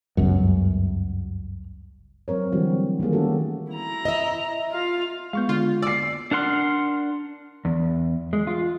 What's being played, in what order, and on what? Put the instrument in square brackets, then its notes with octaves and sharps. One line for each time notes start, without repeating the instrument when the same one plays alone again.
[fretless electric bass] G1 C#2 F#2
[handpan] F#3 C4 A#4 C#5
D3 E3 G3 A3 C4 F#4
D#3 G3 A#3 G#4
A3 B3 C#4 F#4 G4 A4
[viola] E4 A#5
[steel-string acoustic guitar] D#5 E5
[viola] F4 F5
[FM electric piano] G#3 B3 [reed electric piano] F5 C#6 G6
[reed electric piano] D3 [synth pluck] F4
[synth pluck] D5 [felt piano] E6 C7
[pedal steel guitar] D4 A#4 F#5 C6 F6
[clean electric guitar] E2
G#3
F4